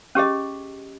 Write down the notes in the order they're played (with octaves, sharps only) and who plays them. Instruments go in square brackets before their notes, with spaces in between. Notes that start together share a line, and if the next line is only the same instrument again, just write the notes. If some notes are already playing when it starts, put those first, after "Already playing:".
[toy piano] C#4 G4 G#4 D#5